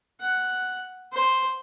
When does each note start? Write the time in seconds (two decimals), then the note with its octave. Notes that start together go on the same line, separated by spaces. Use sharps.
0.20 F#5
1.12 C5